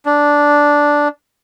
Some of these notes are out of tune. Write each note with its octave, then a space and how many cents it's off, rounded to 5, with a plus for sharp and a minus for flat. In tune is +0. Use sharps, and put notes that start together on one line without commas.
D4 -5